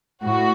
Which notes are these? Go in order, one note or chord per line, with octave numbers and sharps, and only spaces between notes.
A2 F#4